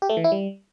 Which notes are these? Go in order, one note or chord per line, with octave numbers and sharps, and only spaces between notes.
G4
A3
E3
E4
G3